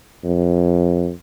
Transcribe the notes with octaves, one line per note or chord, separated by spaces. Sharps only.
F2